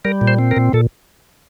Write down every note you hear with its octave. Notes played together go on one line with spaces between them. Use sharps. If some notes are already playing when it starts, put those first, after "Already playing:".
G3 A#4
A#2
C5
C4
A#4
A#2
A#2 A4